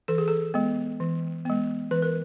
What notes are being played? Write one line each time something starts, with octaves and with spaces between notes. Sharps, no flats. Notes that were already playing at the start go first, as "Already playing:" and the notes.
E3 A4
G#4
A4
G#3 B3
E3
G#3 B3
E3 B4
A#4